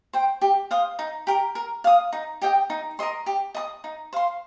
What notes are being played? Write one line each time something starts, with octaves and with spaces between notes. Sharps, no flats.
C5 G5
G4
C5 F5 D#6
D#4
G4 A#4
A#4
F5 D#6
D#4
G4 D#5 G5
D#4
A#4 D#5 C6
G4
D#5 A#5 D#6
D#4
C5 F5 C6